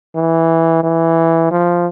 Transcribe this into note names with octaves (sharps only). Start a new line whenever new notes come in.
E3
E3
F3